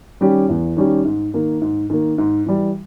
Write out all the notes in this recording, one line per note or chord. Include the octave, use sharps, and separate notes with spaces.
D#3 G3 C#4 G4
E2
D#3 G3 C#4 G4
G#2
D#3 A#3
G#2
D#3 A#3
G#2
E3 G3